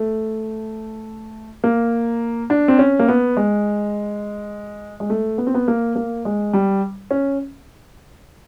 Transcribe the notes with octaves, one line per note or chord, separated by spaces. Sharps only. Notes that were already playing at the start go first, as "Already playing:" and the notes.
Already playing: A3
A#3
D4
C4
C#4
A#3
B3
G#3
G#3
A3
B3
C4
B3
A#3
A#3
G#3
G3
C#4